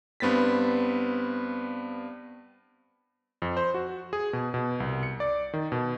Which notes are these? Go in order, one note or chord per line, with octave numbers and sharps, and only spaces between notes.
G2 B3 C4 A6 B6
F2
C5
F#4
G#4
B2
B2
C2
C#7
D5
D#3
B2